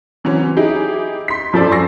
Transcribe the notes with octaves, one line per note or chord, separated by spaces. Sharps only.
C#3 E3 F#3 C4 C#4
D#4 E4 G4 G#4
C6 B6
F#2 F3 A4 C5 D5 E6
G#5 C#6 E6 A#6 C7